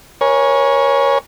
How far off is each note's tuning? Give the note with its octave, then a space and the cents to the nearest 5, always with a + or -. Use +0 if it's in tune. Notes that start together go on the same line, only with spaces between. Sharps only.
A#4 +40 C#5 +0 G#5 +0